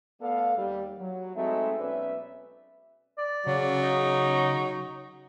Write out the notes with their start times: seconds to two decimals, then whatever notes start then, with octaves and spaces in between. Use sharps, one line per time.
0.21 A3 B3 A4 D5 F5
0.57 D#2 G3
0.99 F#3
1.36 G#3 A3 C4 D#4 F#4 E5
1.79 B1 C#4 B4 D5 E5
3.18 D5
3.47 C#3 F#3
3.82 D#4